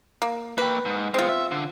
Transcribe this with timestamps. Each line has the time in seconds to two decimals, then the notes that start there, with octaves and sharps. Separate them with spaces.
0.22 A#3
0.58 A#3 B4 G5
0.85 G#2
1.14 G#3 B3 C4 F4
1.29 E5
1.51 D3